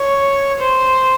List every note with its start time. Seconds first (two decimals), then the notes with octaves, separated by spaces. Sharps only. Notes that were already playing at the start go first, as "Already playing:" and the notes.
Already playing: C#5
0.60 C5